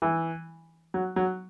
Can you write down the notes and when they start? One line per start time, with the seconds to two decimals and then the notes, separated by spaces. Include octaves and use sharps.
0.02 E3
0.94 F#3
1.16 F#3